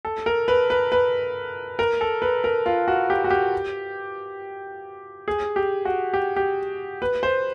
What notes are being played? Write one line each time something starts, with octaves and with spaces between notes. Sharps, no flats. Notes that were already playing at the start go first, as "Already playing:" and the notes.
A4
A#4
B4
B4
B4
A#4
A4
B4
A#4
F4
F#4
G4
F#4
G4
G#4
G4
F#4
G4
G4
B4
C5